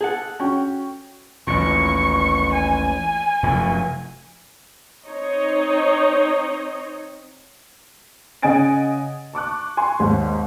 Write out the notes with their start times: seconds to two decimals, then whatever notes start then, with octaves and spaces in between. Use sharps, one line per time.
0.01 G#4 A4 F#5
0.40 C#4 F#4 G5
1.47 A1 D#2 A#2 C#6
2.52 G#5
3.43 F1 F#2 A2
5.06 C4 D#4 C#5 D#5
8.42 C#3 D#5 F#5 G#5 A6 D7
9.34 A5 C#6 D6 F#6
9.77 G#5 C6 C#6
9.99 G#1 D#2 G#2 G#3